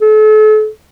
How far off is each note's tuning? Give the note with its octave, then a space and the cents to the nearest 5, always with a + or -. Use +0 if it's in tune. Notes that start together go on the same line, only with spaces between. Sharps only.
A4 -40